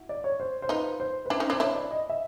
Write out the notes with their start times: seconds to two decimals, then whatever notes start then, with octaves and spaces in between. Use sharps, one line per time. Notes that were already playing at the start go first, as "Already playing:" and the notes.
Already playing: E4 F#4
0.09 D5
0.24 C#5
0.40 C5
0.62 C5
0.69 D#4 F4 B4
1.00 C5
1.26 B4
1.30 D4 E4 C5
1.40 C#4 D#4
1.50 D4 E4 C5
1.60 D4 E4 C#5
1.75 D5
1.91 D#5
2.10 E5